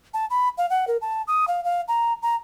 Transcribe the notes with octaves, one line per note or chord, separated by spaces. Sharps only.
A5
B5
F5
F#5
A#4
A5
D#6
F5
F5
A#5
A#5